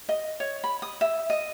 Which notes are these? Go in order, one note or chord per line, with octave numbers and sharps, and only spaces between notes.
D#5
C#5
B5
D#6
E5
D#5